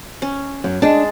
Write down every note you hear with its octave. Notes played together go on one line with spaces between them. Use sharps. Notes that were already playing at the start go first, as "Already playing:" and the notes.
C#4
F#2
G#3 D4 A5